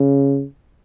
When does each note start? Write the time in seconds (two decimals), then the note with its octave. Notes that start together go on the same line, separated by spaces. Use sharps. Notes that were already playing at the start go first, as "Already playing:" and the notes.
Already playing: C#3